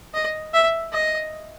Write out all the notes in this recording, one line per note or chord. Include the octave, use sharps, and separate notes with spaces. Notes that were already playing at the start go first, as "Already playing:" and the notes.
D#5
E5
D#5